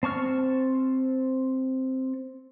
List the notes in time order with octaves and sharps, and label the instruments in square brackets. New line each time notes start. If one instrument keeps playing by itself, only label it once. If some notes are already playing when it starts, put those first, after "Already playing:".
[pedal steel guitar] C4 A5 C#6 F6